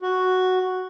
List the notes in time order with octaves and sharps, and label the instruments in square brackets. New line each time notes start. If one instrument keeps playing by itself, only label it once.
[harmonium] F#4